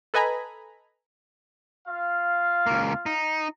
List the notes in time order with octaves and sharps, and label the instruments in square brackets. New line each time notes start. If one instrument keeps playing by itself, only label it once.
[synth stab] A4 B4 D#5 G#5 A#5 B5
[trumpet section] F4 F5
[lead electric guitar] C#2 A#3
D#4